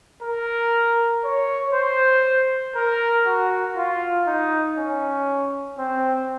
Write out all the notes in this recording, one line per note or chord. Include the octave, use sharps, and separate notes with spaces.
A#4
C#5
C5
A#4
F#4
F4
D#4
C#4
C4